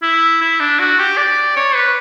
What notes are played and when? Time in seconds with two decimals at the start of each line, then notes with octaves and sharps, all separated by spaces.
0.02 E4
0.41 E4
0.60 D4
0.79 F#4
0.99 G4
1.17 D5
1.56 C#5
1.75 B4